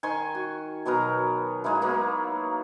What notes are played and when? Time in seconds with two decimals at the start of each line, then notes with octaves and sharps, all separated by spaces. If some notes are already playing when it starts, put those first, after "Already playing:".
0.03 D#3 G#5 C6 C#6
0.35 F#4
0.86 B2 F#3 B3 A#4
1.64 G#3 A#3 D#4 E4
1.82 F#3 A#3 B3